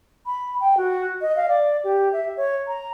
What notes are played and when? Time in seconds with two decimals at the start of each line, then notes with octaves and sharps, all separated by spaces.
0.26 B5
0.60 G5
0.77 F#4
1.21 D#5
1.36 F5
1.48 D5
1.84 G4
2.13 E5
2.37 C#5
2.68 A#5